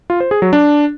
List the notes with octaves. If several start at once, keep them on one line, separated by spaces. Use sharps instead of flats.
F4
C5
G#4
F#3
D4